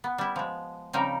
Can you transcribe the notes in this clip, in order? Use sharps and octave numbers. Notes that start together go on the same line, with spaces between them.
B3
G3 E4
F3 G#3
C#3 F3 G3 C4 D#4 A#4